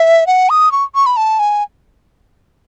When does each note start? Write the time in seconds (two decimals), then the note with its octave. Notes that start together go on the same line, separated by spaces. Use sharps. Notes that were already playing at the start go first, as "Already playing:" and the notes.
Already playing: E5
0.27 F#5
0.50 D#6
0.72 C#6
0.95 C#6
1.06 B5
1.17 A5
1.39 G#5